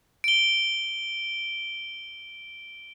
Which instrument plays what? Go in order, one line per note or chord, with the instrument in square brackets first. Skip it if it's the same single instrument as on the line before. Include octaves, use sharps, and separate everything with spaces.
[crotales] D7 G7